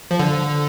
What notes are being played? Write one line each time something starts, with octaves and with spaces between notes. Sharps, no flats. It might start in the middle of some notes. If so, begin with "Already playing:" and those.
F3
D3